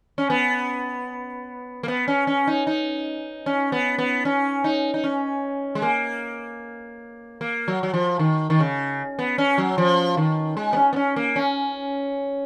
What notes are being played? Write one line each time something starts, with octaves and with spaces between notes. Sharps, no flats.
C#4
B3
A#3
B3
C#4
C#4
D#4
D#4
C#4
B3
B3
C#4
D#4
D#4
C#4
G#3
A#3
A#3
F#3
F#3
F3
D#3
D#3
C#3
B3
C#4
F#3
F3
D#3
G#3
B3
C#4
B3
C#4
A#3
C#4